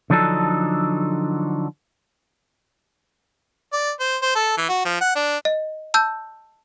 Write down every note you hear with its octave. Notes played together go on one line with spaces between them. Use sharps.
D3 F3 F#3 D4 D#4 A4
D5
C5
C5
A4
E3
F#4
F3
F#5
D4
D#5
A5 E6 G6